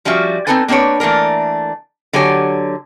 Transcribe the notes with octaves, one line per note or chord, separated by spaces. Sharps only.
F3 G3 C#4 F4 F#4 E5
C4 C#4 D#4 A4 B4 G#5
A#3 C4 D4 B4 C#5
E3 A3 A#3 D4 A#4
D3 F#3 G4 C#5 G#5